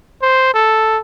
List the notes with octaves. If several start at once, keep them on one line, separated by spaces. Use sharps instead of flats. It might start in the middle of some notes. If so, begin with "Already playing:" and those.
C5
A4